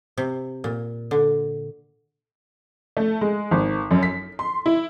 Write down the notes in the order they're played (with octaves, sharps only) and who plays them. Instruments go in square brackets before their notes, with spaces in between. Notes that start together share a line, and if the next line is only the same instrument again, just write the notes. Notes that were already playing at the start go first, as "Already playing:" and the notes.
[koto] C3
A#2
D3
[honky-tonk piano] A3
G#3
G#1
F#2
B6
C6
E4